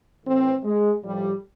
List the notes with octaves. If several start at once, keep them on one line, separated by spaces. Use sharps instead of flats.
A2 E3 C4
G#3
A2 F3 G3